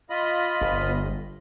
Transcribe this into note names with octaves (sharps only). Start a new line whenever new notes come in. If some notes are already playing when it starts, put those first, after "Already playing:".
F4 D#5 B5
G1